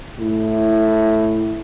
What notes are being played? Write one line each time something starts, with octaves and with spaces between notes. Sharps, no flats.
A2